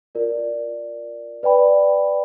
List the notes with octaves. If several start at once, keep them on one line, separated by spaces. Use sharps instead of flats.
F4 A#4 D5
B4 D5 G5 B5